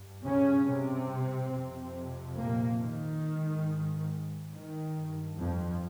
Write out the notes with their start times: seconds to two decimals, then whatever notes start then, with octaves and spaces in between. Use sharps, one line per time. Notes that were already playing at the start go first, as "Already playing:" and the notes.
Already playing: G2
0.23 C#3 C#4
0.66 C3 C4
1.52 F2 C3
2.37 A#2 A#3
2.81 D#3
3.23 G#2
4.53 D#3
4.95 G2
5.39 F2 F3